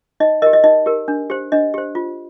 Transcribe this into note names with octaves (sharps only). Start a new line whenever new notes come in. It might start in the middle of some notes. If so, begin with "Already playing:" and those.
D#4 D#5
G4 A#4 D#5
D#5
D#4 D#5
G4 A#4
D4
G4 C5
D4 D#5
G4 C5
F4